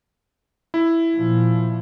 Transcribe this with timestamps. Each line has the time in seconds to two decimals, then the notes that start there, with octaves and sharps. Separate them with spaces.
0.74 E4
1.15 A#2 F3